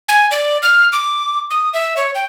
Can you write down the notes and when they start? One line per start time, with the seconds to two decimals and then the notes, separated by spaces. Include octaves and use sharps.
0.08 G#5
0.31 D5
0.62 F6
0.93 D6
1.50 D#6
1.73 E5
1.97 C#5
2.15 G5